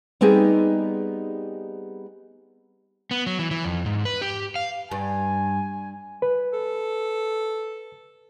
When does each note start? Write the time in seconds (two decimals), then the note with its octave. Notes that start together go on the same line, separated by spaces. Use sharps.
0.21 G3 B3 C4 D#4 G4 G#4
3.11 B3
3.26 F#3
3.39 E3
3.51 E3
3.65 F2
3.86 G#2
4.05 B4
4.22 G4
4.56 F5
4.91 G2 G#5
6.22 B4
6.53 A4